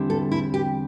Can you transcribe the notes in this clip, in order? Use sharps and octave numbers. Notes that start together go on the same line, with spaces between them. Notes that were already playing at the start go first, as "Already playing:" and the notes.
Already playing: E2 D3 G3 C4 E4
A4
E4
G4